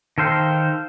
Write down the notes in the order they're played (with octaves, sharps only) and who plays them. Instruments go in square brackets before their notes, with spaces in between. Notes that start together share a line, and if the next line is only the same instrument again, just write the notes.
[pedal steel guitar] D#3 A4 C5 F5 G5